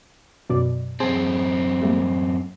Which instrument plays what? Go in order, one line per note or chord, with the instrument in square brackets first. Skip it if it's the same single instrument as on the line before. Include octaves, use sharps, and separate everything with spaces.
[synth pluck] F#2 B2 D5
[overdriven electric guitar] F#2 C4 [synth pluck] G#4 C5 A5
[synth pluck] G3 A3 A#3